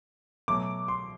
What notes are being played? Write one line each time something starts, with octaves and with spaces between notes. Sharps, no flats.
B2 F#3 A3 D6
C6